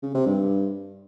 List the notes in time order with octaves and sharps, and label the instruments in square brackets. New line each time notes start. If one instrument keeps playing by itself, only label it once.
[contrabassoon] C#3
C3
G2